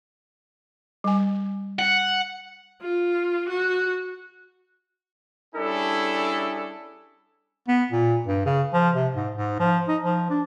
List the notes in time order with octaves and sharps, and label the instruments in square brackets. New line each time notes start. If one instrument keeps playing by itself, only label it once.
[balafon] G3 G#5
[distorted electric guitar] F#5
[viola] F4
F#4
[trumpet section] G3 C#4 D4 E4 G#4 A4
[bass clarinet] B3
A#2
G2
C#3
F3
C3
G#2
G#2
F3
D#4
F3
D4